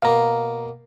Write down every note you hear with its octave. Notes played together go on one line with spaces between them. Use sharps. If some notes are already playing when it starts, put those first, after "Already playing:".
B2 A#3 F5 A#5